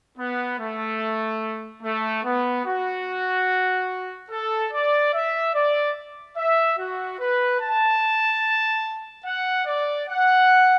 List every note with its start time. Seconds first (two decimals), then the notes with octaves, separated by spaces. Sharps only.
0.18 B3
0.59 A3
1.83 A3
2.24 B3
2.66 F#4
4.30 A4
4.73 D5
5.13 E5
5.54 D5
6.36 E5
6.79 F#4
7.20 B4
7.61 A5
9.26 F#5
9.66 D5
10.09 F#5